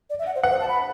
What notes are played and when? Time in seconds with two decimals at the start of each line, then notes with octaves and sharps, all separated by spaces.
0.10 D5
0.19 E5
0.26 F#5
0.35 C5
0.43 B4 F#5
0.51 C5
0.60 A5
0.69 B5